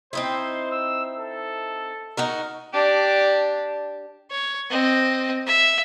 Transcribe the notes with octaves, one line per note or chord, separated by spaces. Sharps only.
C4 D#4 E4 C5
E6
A4
D#4 F#4 A#4
D4 G4
C#5
C4 D#5
E5